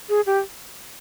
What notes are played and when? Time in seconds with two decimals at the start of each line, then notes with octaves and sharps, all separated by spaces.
0.09 G#4
0.26 G4